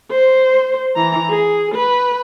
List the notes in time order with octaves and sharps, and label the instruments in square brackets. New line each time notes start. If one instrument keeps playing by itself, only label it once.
[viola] C5
E3 A#5
G#4
B4